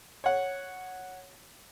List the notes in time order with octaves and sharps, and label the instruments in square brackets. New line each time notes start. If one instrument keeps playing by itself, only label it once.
[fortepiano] C#5 F#5